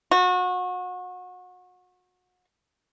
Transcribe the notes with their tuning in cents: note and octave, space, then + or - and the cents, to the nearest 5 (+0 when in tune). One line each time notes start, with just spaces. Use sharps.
F#4 -30